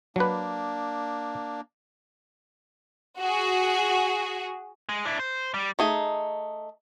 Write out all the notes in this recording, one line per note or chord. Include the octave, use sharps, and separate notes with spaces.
F#3 A#3 D4 B4
F#4 G#4
G#3
D4 E4
C5
G3
A3 D#4 G#4